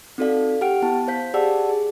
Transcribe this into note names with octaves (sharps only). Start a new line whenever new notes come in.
C4 D#4 F#4 A4 D5 F5
G4 F#5 G5 F6 D7
B3 E4 A5
C5 F5 G6 B6
G4 G#4 D5 F#5 A5 E6
G#4